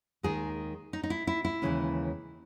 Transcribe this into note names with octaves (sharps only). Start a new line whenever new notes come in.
D#2 D#3 G#3 G#4
D#4
D#4
E4
E4
E4
D#2 C#3 E3 G#3 C#4